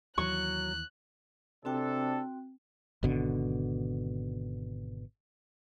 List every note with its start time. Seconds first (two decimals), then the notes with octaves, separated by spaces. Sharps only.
0.18 D#2 E3 F#3 C#6 F#6
1.65 C3 C4 D4 F#4 A4 G5
3.03 G#1 B2 D3